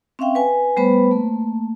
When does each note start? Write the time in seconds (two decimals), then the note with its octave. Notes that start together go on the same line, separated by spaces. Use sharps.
0.19 C4 C#4 E5 F5 G5
0.35 B4 G#5
0.77 G3 A3 B3 B4 C5 B5
1.11 A3 A#3